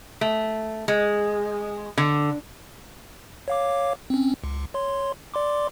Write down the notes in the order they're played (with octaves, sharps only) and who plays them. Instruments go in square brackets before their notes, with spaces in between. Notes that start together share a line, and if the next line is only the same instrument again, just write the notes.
[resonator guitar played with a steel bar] A3
G#3
D3
[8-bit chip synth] C#5 F5 D6
C4 C#4
C#2
C#5 C6
D5 C6 D6